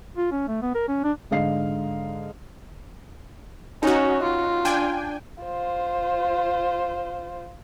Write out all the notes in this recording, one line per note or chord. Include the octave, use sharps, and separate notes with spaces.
F4
C#4
A3
B3
A#4
C#4
D4
G#2 D3 D#5 F5 C7
C#4 D#4 F#4
F4
D4 G5 G#5
F4 C5